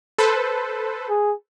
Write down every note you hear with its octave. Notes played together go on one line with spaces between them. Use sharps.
A4 B4 C5
G#4